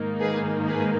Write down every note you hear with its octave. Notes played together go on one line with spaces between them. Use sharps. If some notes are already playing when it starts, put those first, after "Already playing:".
Already playing: G#2 D#3 A#3 D#4
G#4 B4
G#4 B4